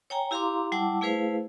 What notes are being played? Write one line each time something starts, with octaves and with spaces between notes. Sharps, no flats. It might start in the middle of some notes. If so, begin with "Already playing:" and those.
C#5 G5 G#5 A#5
E4 G4 F5 A#5 C6 D6
G3 E4 F#5 A5 D6 E6
A3 E4 G#4 B4 C5 F5